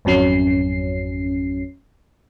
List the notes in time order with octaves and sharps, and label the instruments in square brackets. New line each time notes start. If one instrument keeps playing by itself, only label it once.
[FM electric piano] G#1 F2 F#3 C#4 C7